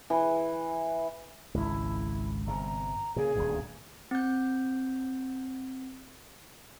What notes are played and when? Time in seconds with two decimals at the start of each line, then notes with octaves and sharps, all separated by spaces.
0.10 E3
1.54 G#1 C#2 E4
2.47 G1 C3 A#5
3.16 A#2 C#3 G#4
3.36 D#1 D2 G2
4.11 C4 G6